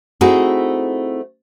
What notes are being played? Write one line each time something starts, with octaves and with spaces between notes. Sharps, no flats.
A3 C4 D#4 E4 F#4 G#4